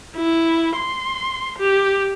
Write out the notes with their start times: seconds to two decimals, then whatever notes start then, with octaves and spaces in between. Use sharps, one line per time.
0.16 E4
0.76 C6
1.58 G4